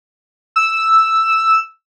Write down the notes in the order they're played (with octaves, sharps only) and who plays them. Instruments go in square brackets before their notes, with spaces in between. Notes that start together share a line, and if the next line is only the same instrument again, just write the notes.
[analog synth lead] E6